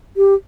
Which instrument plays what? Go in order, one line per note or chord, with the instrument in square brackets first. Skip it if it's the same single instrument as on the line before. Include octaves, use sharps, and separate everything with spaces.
[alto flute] G4